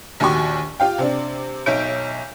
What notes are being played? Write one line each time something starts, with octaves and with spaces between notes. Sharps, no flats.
A#1 D#2 F#4 G4 C#6
F4 G4 F5 G5
C3 C4 D4
B1 D#4 C#5 E5 G6 D7